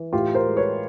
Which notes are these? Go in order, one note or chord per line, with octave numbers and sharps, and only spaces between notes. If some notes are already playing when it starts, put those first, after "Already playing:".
Already playing: E3
A2 F4 G4
A#4 C5
G#3
B4 C#5